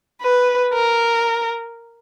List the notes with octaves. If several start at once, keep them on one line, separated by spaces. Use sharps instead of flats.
B4
A#4